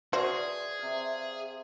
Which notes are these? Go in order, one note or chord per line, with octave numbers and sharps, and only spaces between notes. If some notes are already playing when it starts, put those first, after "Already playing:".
F#4 G#4 B4 C5 D5 E5
C3 F5